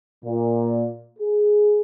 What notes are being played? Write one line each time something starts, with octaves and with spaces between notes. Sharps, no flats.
A#2
G#4